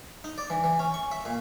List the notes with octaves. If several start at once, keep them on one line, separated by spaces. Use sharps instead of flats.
D#4
D5
E3
E3
C#4
C#6
E5
A#2